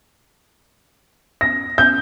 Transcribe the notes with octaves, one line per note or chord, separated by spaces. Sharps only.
A#6
G6